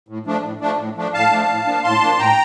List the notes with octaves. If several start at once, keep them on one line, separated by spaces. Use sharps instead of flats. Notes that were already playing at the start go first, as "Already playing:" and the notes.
A2
F3 A3 D4
A2
F3 A3 D4
A2
F3 A3 D4
A2 F5 A5
F3 A3 D4
A2
F3 A#3 D4
A2 A5 C6
F3 A#3 D4
A2 G5 A#5